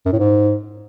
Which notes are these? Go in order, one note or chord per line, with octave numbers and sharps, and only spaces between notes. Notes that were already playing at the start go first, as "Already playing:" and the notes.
F#2
A2
G#2